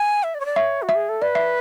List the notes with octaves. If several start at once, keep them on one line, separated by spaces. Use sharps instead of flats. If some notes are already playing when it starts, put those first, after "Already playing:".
Already playing: G#5
E5
D5
C#5
D5
C#5 E5
F#4
E5
G#4
A4
B4 D5
E5